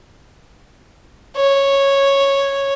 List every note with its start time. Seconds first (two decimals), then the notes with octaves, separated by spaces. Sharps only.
1.36 C#5